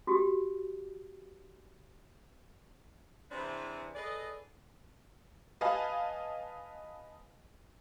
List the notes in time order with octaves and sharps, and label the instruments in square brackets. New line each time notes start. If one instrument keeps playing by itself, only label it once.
[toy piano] F#4 G4
[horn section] C3 E3 C4 D4 G#4 B4
G#4 A4 B4 D5 D#5
[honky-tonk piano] B4 D#5 F5 G#5 A5